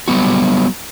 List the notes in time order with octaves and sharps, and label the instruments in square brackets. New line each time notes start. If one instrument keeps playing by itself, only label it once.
[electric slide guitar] F#3 G3 B3 F#4